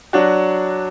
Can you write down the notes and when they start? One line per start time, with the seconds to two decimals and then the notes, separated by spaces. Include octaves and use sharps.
0.13 F#3 D4 F#4